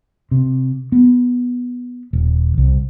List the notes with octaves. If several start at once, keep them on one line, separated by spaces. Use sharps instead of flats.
C3
B3
D#1
C2